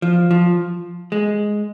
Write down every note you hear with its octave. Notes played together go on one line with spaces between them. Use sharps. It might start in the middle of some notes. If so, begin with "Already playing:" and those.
F3
F3
G#3